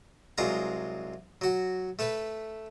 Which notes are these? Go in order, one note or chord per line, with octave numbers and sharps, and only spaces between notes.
C2 F#3 G#3 F4 A#5
F#3 F#4
A3 A4 B4